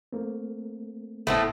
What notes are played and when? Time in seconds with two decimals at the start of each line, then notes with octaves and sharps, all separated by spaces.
0.13 A3 A#3 C4
1.27 G1 A2 A3 B3 C4